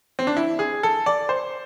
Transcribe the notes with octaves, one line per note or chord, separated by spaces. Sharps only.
C4
D4
E4
G#4
A4
D5
C5